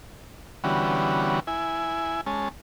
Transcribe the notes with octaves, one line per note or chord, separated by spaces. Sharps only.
D3 E3 G3 B3 C#4 F#4
E4 G#5
G#3 C#4 A5